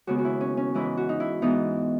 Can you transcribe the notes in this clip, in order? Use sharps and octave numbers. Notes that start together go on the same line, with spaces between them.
D#2 C#3 G#3 B3 F#4
F#4
E4
C#4
C#4
G#2 E3 G#3 E4
F#4
D#4
E4
G#2 E3 B3 D#4